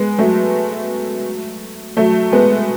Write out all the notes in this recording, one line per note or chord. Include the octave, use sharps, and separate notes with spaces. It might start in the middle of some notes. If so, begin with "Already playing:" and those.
Already playing: G#3 B3
F#3 A3
F#3 A3
G#3 B3